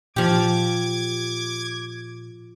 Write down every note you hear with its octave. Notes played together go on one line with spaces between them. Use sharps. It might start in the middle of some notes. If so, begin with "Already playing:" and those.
A#2 F3 G4 D6 G#6